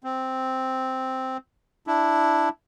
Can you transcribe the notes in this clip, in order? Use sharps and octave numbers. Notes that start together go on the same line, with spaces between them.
C4
D4 E4